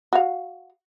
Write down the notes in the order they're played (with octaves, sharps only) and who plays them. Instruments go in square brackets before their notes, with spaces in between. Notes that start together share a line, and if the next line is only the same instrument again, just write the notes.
[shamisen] F#4 F5